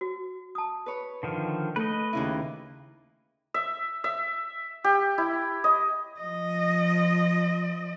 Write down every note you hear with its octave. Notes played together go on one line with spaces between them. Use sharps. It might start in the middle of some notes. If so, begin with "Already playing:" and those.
F#4
A5 D#6
B4 C#5
D3 D#3 F3
A3 B4 D#5
D#2 C#3 E4
E5
E5
G4
E4
D#5
F3 D#5